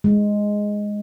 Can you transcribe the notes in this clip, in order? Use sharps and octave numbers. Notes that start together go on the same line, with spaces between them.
G#3